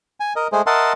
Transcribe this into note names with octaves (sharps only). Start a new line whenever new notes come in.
G#5
A#4 D#5
G#3 A3 G#4 C5
A#4 D#5 E5 F#5 A5 C6